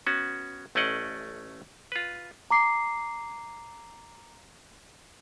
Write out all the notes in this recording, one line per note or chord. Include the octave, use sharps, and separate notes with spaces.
B3 C#4 F#4
A1 A3 C#4 D5 D#5 F#5
F4 B4
A#5 D6 C7